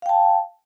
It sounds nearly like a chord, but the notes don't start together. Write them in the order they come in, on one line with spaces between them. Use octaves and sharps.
F5 G5 A5